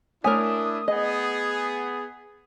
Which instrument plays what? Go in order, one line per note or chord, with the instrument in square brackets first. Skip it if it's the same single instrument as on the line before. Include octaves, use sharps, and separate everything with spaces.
[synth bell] A3 B6 [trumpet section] D4 E4 [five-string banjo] A#4 C#5 G#5 [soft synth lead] D#6
[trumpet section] B3 G#4 [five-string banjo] D#5